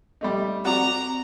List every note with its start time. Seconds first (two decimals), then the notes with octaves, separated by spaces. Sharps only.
0.21 G3 A3 D#4
0.65 C4 F#4 D5 A#5 D6